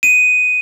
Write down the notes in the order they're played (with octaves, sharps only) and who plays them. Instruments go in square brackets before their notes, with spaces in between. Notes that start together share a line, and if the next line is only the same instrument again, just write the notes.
[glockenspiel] D#7